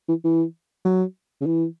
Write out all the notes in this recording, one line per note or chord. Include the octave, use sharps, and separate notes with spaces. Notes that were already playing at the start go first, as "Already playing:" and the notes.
E3
E3
F#3
C#3
E3